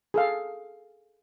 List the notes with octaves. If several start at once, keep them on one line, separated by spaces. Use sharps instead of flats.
G#4 A4 F5